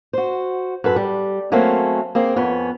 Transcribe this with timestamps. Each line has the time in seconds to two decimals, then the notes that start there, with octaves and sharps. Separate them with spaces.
0.13 F#4 C5
0.84 F#2 A4 B4
0.96 G3
1.52 F#3 A3 A#3 C4 C#4
2.15 A#3 C4 G#4
2.36 F2 B3 C#4